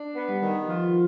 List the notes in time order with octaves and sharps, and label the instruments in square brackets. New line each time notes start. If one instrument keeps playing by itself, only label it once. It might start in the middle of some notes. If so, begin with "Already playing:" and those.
Already playing: [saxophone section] D4
B3
[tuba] G3
[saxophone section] D#3
[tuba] F3 [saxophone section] F4